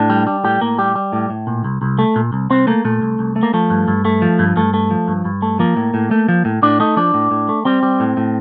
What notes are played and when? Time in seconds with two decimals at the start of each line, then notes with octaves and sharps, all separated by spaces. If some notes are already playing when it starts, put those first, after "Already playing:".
Already playing: A2 D4
0.10 G3
0.27 G3
0.44 A2 G4
0.61 A2 A#3
0.78 G3 G4
0.95 G3
1.13 A2
1.30 A2
1.47 A#2
1.64 C2
1.82 C2
1.99 A3
2.16 A#2
2.33 C2
2.50 C2 C4
2.67 A3 A#3
2.85 A#2 A3
3.02 C2
3.19 C2
3.36 A3
3.43 A#3
3.54 F3 A3
3.70 G2
3.88 G2
4.05 A3
4.22 F3
4.39 G2
4.56 G2 A3
4.74 A3
4.91 F3
5.08 G2
5.25 G2
5.42 A3
5.59 F3 A#3
5.77 A2
5.94 A2
6.11 A3
6.29 F3
6.45 A2
6.62 A2 D4
6.80 A3 D#4
6.97 F3 D4
7.14 A2
7.31 A2
7.49 A3
7.65 G3 C4
7.83 G3
8.00 A2
8.17 A2